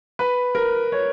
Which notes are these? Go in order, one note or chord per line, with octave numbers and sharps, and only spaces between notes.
B4
A#4
C#5